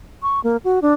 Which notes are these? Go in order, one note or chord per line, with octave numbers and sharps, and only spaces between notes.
C#6
A#3
F#4
D4